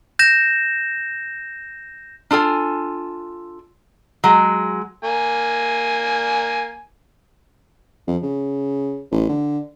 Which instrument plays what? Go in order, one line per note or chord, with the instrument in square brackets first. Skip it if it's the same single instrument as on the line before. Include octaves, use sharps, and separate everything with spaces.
[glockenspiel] G6 A#6 E7
[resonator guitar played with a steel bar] D4 F4 A4 G#5
F#3 G#3
[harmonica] A#3 G#5
[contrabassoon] F2
C#3
A1
D3